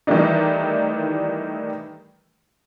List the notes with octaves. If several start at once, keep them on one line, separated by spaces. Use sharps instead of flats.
D#3 E3 G3 A3 D4 D#4